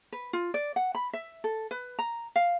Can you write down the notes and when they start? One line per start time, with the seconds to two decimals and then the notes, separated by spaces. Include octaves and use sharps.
0.12 B4
0.33 F4
0.54 D5
0.76 F#5
0.95 B5
1.13 E5
1.44 A4
1.71 B4
1.99 A#5
2.36 F5